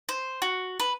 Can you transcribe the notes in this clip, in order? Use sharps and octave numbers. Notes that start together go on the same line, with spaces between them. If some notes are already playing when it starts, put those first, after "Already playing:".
C5
F#4
B4